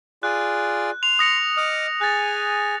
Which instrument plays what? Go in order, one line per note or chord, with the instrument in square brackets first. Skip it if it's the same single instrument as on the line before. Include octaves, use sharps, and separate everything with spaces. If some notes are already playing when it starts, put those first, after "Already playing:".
[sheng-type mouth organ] F4 G#4 D5 [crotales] F#6
[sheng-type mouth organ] C6 [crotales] F7
[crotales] D#6 A#6 C#7
[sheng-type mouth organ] D#5 D6 F6
[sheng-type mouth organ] G#4 G#5 [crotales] F#6 A6